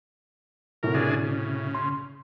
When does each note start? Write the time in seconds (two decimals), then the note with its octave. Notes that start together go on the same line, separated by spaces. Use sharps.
0.83 A2 C3 F#4 A#4
0.94 C#3 D4 G#4
1.24 C#3
1.74 C6